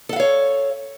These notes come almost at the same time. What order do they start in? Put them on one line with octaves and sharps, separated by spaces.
A4 F#5 F5 C#5